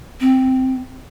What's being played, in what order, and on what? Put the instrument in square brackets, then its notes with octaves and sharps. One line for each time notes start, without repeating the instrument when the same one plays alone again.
[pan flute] C4